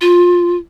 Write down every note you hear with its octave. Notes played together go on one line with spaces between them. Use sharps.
F4